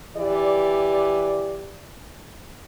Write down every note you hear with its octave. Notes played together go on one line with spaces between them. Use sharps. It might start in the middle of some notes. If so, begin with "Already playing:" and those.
E3 G4 D5